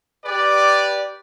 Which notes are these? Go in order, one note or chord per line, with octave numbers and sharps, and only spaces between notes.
G4 B4 D5